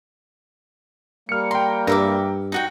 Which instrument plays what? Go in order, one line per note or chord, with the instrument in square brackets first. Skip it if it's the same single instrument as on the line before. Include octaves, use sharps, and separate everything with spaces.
[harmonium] G3 A#3 [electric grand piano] F6 C#7
[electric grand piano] G5 A#5 [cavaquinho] C6
[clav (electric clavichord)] G2 [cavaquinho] A#4 E5 D6
[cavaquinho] D#4 F#4 G5